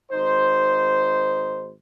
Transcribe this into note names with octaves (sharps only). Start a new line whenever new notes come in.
G#1 D#4 C5